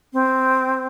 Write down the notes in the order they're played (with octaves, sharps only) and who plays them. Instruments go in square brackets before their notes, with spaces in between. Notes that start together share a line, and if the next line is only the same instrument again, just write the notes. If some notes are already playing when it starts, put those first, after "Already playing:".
[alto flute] C4